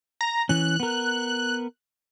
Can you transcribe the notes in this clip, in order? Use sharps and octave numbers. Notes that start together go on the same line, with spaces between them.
A#5
E3 C#4 F#6
B3 A#4